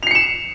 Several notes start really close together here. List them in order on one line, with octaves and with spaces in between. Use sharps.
F7 C7 C#7 E7